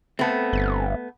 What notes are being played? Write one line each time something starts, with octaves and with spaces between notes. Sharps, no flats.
A3 B3 C4 A4
G1